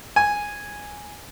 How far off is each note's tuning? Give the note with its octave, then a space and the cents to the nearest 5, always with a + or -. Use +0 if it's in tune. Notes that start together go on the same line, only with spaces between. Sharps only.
G#5 -5